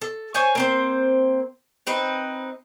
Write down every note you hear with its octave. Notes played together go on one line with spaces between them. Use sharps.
A4
C5 C#5 G#5
A#3 C4 C5
C4 D#4 B4